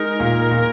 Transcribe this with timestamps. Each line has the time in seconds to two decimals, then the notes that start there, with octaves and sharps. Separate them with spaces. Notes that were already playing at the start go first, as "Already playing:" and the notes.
Already playing: G#3 D#4 A#4
0.20 A#2
0.51 A#2